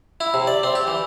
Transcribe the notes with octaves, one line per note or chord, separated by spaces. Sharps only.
E4
C3
D5
C4
G4
E3